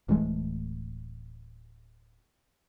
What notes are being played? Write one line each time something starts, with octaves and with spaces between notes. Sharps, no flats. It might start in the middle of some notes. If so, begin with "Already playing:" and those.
D1 E3 G#3 A3